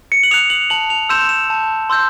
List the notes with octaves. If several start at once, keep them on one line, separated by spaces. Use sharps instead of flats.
C#7
F#7
D#6 F#6 F7
F#7
A5 F#7
F7
C6 E6 G6 E7
E7
A5
C6 E6 G6